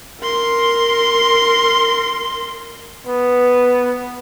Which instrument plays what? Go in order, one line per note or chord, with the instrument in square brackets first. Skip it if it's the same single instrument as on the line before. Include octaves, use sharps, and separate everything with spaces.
[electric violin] A#4 C6
[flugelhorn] B3